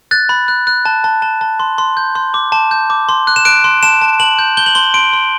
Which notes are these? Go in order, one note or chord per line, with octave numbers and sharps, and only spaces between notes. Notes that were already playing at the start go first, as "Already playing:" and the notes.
F#6 A6
B5
F#6
F#6
A5
A5
A5
A5
C6
C6
G6
C6
D6
A5
G6
D6
C6
F#6
E7
F#6 D7
C6
A5 E7
A5
A5 F#7
G6
G6 G7
F#7
C6 G7
C6 D7
C6